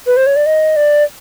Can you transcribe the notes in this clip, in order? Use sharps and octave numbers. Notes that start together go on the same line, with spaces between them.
B4
C5
C#5
D5
D#5
D5